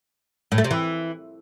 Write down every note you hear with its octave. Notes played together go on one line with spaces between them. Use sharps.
A2
A3
C3
E3